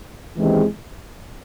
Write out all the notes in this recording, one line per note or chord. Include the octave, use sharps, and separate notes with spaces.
D#2 C#3 E3 G#3 C4